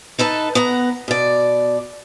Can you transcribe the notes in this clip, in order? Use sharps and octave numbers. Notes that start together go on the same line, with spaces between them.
D#4 A4 B4 A5
B3 F#5 A#5
B2 D5